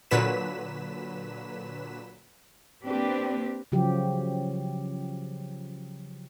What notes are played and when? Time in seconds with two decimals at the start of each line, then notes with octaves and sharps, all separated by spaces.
0.11 A#2 D3 F#3 B4 B6 E7
2.84 A#3 C4 D4 G4 B4
3.72 C#3 F3 F#3 G4